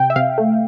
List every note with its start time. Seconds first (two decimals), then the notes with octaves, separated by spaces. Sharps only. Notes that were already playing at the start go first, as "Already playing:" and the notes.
Already playing: C3 G5
0.10 E5
0.16 C3 F5
0.38 A3